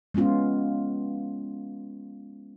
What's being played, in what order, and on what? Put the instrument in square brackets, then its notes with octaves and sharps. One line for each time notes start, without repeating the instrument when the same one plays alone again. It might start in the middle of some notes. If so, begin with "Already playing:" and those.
[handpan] G#3 B3 C#4 F4